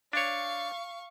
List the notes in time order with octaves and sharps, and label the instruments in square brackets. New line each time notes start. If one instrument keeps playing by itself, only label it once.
[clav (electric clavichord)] D4 C#5 [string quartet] F5 C#6